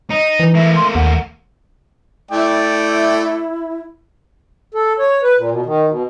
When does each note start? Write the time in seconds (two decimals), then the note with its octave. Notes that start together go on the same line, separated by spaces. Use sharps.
0.10 D#4
0.39 E3
0.55 A3 A#3 E5
0.76 C6
0.95 D#2 F#5
2.31 A3 E4 D5 G5
4.74 A4
4.99 C#5
5.22 B4
5.37 A#2
5.51 B2
5.66 D#3
5.88 B2